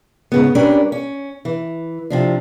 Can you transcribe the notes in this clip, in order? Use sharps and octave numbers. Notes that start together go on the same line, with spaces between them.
G#2 C#3 B3
G3 C#4 D4 A#4 B4 D5
C#4
E3
C3 F3 D4